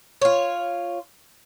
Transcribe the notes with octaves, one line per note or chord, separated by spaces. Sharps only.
F4 C#5